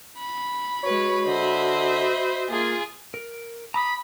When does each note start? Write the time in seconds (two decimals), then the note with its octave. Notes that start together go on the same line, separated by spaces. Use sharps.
0.19 B5
0.83 G#3 F#4 B4 C#5
1.26 D3 C5 D#5 E5
2.50 A#3 F4 G#4 G#5
3.14 A#4
3.74 A#5 B5 D6 D#6